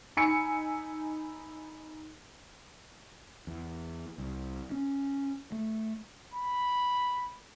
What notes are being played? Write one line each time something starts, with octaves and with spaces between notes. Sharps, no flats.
D#4 G#5 B5 E6 C#7
E2
C2
C#4
A3
B5